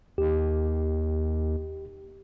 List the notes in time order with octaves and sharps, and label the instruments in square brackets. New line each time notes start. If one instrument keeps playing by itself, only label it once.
[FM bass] D#2 [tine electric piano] G4